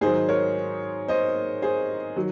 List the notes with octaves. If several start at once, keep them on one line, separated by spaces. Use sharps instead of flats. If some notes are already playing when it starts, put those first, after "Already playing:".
G#2 D#3 F#3 G#4 C5
A#4 C#5
C5 D#5
G#4 C5
D#3 F#3